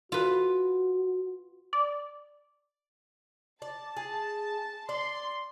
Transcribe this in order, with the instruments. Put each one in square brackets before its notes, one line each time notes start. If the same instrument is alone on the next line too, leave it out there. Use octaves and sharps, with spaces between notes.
[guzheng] F4 B4 [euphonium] F#4
[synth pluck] D5
[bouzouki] D5 [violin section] A5
[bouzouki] G#4
[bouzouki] D5 [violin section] C6